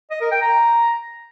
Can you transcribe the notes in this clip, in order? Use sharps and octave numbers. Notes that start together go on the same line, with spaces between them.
D#5
A#4
G5
A#5